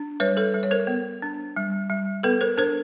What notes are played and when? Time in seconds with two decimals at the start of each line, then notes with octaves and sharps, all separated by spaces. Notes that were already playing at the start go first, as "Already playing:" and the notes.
Already playing: D4
0.20 G3 B4 C#5
0.37 A4 B4
0.54 G3
0.63 C#5
0.71 A#4 C5
0.87 B3
1.22 D4
1.56 G3
1.90 G3
2.23 B3 A4 B4
2.41 A#4 C5
2.58 D4 A#4 C5